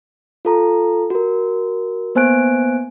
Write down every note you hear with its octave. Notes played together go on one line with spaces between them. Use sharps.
F4 A4 A#5
F#4 A#4
A#3 B3 C5 G#5 F#6 D7